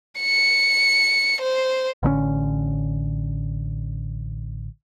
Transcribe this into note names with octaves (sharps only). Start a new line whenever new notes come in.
C#7
C5
A1 D3 A3 C#4